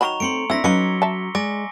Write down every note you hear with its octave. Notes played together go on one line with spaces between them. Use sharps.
D#3 F#3 A#5 B5 C#6 F7
A3 C4 C6 C#7 D7
C4 D4 E4 C5 E6 A#6 B6
F#3 C#4 D#4 B4 F5 D6 C#7 G7
E5 A5
G#3 D5 G#5 D6 A#6